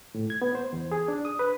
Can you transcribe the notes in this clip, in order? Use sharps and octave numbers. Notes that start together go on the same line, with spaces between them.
A2
G#6
B3
C5
E2
G#4
D4
D#6
B4